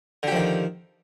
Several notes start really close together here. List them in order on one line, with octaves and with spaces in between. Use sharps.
D3 G4 F3 D#3